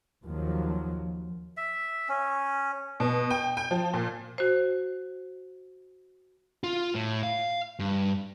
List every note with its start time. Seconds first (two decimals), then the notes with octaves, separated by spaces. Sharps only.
0.24 D#2 F3 F#3
1.57 E5
2.09 C#4
3.00 B2
3.30 G5
3.57 G5
3.71 F3
3.94 A#2
4.38 F#4 C5
6.64 F4
6.95 A2
7.23 F5
7.79 G2